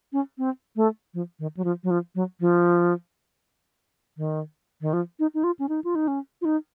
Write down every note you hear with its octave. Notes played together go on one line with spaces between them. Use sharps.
C#4
C4
A3
F3
D#3
F#3
F3
F#3
F3
F#3
F3
D#3
D#3
F3
D#4
D#4
F4
C#4
D#4
F4
D#4
C#4
F4
D#4